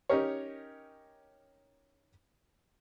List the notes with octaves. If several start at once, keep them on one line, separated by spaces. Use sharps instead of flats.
C#4 D#4 G4 A#4 C#5